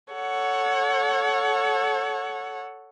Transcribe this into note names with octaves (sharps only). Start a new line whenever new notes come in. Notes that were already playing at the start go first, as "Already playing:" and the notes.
A4 C#5 F#5